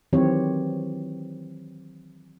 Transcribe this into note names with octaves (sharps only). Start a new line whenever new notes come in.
D#3 E3 F#3 C4 G4 C#5